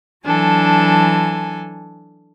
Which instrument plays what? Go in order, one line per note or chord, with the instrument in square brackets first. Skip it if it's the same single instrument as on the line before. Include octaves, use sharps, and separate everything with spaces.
[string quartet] E3 F#3 D4 A4 G#5